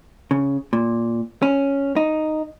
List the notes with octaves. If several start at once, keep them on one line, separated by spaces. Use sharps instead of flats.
C#3
A#2
C#4
D#4